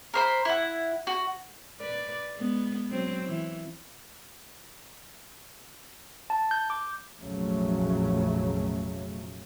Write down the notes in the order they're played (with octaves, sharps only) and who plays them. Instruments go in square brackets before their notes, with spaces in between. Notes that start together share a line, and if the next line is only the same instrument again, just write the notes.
[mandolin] A#4 C5 B5
E4 F#5
F#4
[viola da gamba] B4 D5
G#3 B3
F#3 C4
E3
[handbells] A5
G6
D6
[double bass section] F1 A#1 C#3 F#3 A3